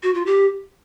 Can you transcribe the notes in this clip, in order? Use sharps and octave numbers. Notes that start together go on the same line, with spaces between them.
F#4
F4
G4